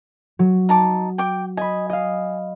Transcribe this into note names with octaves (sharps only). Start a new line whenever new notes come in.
F#3
D#4 A5 D6
G5 D6
D#5 G#5 B5
D#5 F5